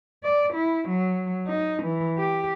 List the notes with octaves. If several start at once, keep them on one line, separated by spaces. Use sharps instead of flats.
D5
E4
F#3
D#4
E3
G4